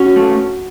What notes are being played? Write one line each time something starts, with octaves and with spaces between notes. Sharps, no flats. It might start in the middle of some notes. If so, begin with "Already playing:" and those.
Already playing: C#4 F#4
A3